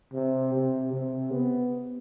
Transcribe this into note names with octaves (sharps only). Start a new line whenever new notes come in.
C3
C3
C3
B3